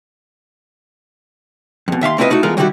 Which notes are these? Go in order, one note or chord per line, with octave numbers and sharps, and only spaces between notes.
F2 B2
D#2 E5 F5 C6
A3 C4 E4 F4 B4 D#5
A3 D#4 E4 F#4
E3 G#3 A3 B3 F4 A#4
D3 D#3 G3 E4 F#4 G4